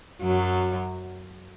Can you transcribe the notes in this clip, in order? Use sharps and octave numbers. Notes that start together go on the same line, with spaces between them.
F#2 F#3